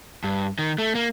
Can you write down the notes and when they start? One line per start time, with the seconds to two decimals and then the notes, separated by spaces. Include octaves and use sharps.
0.24 G2
0.59 D#3
0.78 A3
0.95 A#3